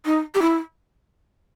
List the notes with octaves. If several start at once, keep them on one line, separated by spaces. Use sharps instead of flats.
D#4
G4
E4